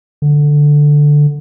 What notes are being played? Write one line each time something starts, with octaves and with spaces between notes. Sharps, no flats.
D3